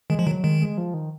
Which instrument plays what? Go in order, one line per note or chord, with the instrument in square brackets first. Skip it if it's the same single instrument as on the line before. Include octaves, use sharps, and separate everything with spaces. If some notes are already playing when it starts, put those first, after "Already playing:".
[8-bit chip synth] D#3 [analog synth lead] G#3
[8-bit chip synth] F3
[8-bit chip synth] D#3 [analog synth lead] F#3
[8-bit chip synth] D#3 [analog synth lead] G#3
[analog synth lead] G#3
F3
D#3